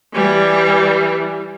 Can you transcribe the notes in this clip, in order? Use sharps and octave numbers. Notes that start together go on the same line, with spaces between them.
E3 G3